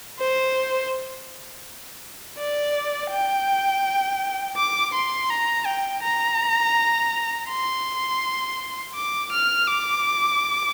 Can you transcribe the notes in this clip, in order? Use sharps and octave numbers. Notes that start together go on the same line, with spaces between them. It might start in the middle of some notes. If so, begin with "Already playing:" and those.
C5
D5
G5
D6
C6
A#5
G5
A#5
C6
D6
F6
D6